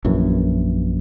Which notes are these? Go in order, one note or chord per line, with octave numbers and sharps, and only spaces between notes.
A#1 F#2 E3